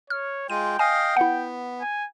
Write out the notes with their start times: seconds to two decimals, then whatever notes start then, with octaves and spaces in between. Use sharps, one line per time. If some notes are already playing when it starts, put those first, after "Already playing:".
0.10 C#5 F6
0.50 G#3 F4 G5 D#7
0.79 D#5 F5 G#5
1.17 B3 E4 F#5
1.82 G#5